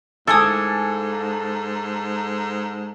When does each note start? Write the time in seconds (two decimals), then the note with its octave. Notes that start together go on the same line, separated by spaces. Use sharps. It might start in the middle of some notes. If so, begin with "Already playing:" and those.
0.27 G#2 A#3 A4 G#5 D#6